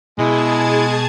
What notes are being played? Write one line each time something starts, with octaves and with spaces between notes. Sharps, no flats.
B2 G#3 E4 G#4 A5 G#6